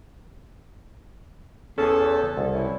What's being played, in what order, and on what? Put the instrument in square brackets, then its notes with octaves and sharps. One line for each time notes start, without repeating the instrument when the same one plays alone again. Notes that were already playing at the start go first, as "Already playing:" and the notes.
[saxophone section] E2 A4 [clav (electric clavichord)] C#4 G#4 G#5
[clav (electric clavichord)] C2
[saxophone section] C3 C#4 E4